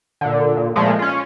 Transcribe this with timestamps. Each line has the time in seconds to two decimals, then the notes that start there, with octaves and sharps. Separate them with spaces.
0.21 A#2 D3
0.57 A#2
0.76 A#2 F3 G#3 A3
0.99 C#4 F4